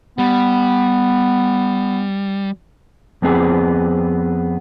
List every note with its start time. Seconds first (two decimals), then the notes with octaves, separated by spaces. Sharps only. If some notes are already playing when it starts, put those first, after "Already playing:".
0.18 G3 B3
3.22 F2 B3 C4 G#4